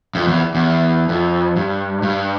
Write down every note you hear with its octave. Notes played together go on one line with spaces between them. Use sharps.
F2
E2
E2
F2
G2
G2